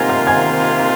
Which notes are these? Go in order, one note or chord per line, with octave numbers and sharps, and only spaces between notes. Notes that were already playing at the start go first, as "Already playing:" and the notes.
Already playing: C3 D#3 A#3 F4 C5 G#5 G#6 A#6
F5 F6
G#5 G#6